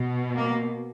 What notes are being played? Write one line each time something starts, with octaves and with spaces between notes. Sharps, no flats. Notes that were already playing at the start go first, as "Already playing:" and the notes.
Already playing: B2
A#3